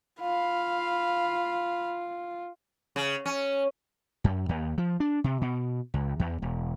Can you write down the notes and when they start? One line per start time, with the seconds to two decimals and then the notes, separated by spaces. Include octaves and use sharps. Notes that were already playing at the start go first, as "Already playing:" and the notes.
0.21 F4 F5 B5
2.96 C#3
3.26 C#4
4.24 F#2
4.49 D#2
4.78 F3
5.00 D4
5.24 C3
5.41 B2
5.94 C#2
6.20 E2
6.42 E1